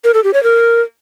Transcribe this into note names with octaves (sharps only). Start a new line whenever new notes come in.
A#4
A4
G4
C#5
A#4